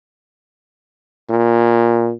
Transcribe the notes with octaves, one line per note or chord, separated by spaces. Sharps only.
A#2